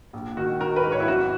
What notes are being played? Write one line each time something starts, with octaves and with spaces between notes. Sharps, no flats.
A#1
D#3 F#4
D#3 A#4
B4
G#2
C#5
E4
G#1 F#4